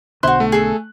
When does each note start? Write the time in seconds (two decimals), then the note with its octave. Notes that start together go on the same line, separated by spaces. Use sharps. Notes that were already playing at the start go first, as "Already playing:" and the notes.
0.23 B1 B2 D3 E4 F#4 C5 C6 F#6
0.40 A3
0.52 G#4 A4